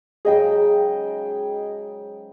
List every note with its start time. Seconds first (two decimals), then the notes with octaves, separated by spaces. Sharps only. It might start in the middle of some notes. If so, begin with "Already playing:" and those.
0.25 G#2 C#3 F#3 G#4 D#5 G5